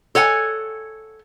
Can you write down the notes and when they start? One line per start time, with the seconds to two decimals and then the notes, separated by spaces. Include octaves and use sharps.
0.15 A4 C#5 F#5 G#5